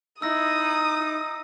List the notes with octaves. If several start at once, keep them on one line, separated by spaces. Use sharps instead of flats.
D#4 E4 D#6 E6 A#6